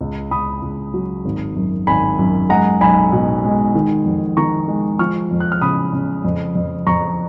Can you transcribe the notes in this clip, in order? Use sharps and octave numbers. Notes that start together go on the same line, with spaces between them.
C#2
C#2 B5 D#6
C#2
F#3
G#1
F#2
G#1 G#5 B5
F#2
G#3 F#5 A#5
B1 G#5 B5
B2
G#3
D#3
F2
D#3 A#5 C#6
G#3
F3 C#6 F6
F2
F#6
F6
C#3 B5 D#6
C#3
F2
F2
F2 A#5 C#6